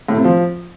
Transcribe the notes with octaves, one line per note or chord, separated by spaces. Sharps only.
A2
C3
F3